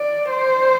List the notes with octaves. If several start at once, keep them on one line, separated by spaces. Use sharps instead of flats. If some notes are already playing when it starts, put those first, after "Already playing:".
Already playing: D5
C5